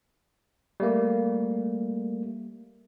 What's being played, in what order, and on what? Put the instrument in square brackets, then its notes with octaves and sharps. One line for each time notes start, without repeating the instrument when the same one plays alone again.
[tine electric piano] G3 A3 A#3